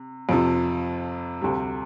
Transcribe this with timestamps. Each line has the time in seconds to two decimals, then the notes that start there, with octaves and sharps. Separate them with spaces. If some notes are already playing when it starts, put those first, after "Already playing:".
Already playing: C3
0.29 F2 C3 F3
1.41 D2 C3 G3